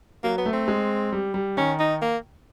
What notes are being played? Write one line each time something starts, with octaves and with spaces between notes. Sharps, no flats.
F#3 A#3
B3
A3
C4
G#3
G3
G3
D#3 C#4
D#4
A#3